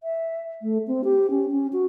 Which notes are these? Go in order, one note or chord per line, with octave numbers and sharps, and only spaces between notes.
E5
A3
C4
G4
C#4
C#4
F#4